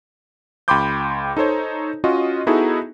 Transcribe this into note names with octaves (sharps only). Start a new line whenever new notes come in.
C#2 G5 B5 C6 D6 G6
D#4 A4 C5 C#5
C#4 F4 F#4 D#5
B3 D#4 E4 F#4 G#4 A4